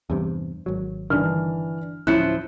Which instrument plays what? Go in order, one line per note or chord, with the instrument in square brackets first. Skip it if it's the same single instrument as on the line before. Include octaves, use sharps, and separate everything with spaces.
[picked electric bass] E2 G2 C3
G#1 F#3
[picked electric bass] G1 G2 D#3 [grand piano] E3 D4 F6
[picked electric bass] D1 C#4 [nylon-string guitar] F3 E4 [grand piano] F#6 C#7